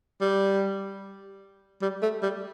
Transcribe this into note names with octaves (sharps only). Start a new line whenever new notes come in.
G3
G3
A3
G3